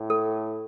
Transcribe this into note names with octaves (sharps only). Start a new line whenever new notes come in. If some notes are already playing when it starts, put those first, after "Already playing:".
Already playing: A2
A4